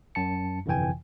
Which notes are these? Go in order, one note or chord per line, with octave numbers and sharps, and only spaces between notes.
F#2 A5 C#7
G1 F2 C3 E3 G5 G#5